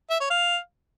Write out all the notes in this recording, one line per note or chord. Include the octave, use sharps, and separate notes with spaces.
E5
C#5
F5